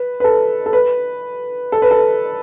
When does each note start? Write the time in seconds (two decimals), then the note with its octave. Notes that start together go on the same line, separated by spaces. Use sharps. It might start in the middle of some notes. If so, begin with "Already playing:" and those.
Already playing: B4
0.20 B4
0.24 A4
0.66 A4
0.73 B4
1.72 A4
1.82 B4
1.91 A4